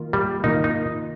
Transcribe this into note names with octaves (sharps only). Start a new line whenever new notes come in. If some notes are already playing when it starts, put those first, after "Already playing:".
Already playing: D#3 A#3 F4 A#4
G3
D#3 A#3 D#4 F4 A#4
D#4